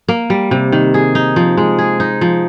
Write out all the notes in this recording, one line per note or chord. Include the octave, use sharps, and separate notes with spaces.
A#3
G3
C3
D#3
G#4
D#4
F3
G#3
G#4
D#4
F3